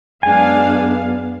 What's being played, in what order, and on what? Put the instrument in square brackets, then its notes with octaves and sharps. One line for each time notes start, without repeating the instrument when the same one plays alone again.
[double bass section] F#2 B3 [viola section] G#3 D4 F5 [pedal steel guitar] G#5